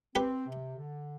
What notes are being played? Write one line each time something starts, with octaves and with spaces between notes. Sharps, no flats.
C4 G4 B4
C3
D3